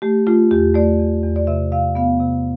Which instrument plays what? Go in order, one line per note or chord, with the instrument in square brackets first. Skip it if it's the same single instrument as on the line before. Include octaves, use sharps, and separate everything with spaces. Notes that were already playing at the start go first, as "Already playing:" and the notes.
[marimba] A3 G4
A3 F4
E2 G4
A3 D5
E2
E2
D5
C3 E5
C3 F5
B3 F5
C3